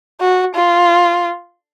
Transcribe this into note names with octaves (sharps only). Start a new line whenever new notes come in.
F#4
F4